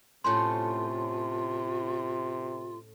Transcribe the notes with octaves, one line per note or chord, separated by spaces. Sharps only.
A2 C3 C#4 F4 C5 C6